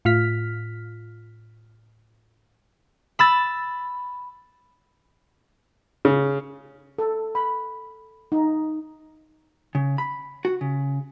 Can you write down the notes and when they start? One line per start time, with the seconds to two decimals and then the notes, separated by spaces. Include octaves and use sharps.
0.05 A2 F4 F6 B6
3.19 B5 E6 A6
6.05 C#3
6.98 A4
7.35 B5
8.32 D#4
9.75 C#3
9.98 B5
10.45 F#4
10.61 C#3